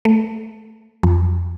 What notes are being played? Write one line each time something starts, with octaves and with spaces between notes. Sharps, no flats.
A3
F2